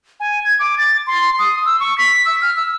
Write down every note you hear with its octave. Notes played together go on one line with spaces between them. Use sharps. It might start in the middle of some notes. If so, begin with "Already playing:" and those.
G#5
G#6
D6
A6
C6
D#6
E6
C#6
B6
E6
F6
E6